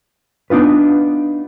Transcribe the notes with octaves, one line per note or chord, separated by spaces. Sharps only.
B3 D4 D#4 F4 B4